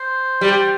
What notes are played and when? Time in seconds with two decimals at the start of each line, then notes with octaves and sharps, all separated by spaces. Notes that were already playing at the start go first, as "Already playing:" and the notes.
Already playing: C5
0.41 G3